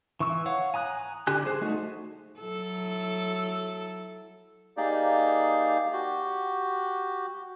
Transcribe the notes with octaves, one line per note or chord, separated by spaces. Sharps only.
E3 C#6 E6
C#5 F5 F#5
G#5 A#5 D#6 F#6
D3 G4 G#5 F#6
G#4 C5
A3 D#4 F#4
F#3 E4 A4
A#3 D#4 G4 G#4 D5
F#4 G4